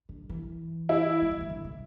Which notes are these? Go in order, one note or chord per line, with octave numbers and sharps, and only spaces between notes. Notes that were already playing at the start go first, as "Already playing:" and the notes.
D3
E3
E4
G#3
F#3
E3
D3
C#3